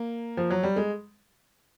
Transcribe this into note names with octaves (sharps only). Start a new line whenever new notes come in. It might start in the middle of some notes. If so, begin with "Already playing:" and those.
Already playing: A#3
F3
F#3
G3
G#3